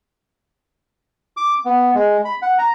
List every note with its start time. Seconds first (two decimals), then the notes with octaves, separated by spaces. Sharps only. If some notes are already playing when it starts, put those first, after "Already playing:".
1.37 D6
1.65 B3
1.94 G#3
2.25 B5
2.42 F#5
2.59 A#5